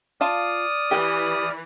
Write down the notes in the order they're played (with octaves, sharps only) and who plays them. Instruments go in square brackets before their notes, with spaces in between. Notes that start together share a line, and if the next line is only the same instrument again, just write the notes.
[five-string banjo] F4 F5 A5 [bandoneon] D5 F6 [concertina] D#6
[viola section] E3 [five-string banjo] G4 G#5